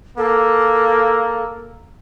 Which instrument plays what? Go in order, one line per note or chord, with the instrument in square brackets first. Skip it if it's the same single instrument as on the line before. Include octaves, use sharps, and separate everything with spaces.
[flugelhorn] A#3 [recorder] A4